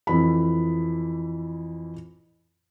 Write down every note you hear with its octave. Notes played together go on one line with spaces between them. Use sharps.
F2 E3 B5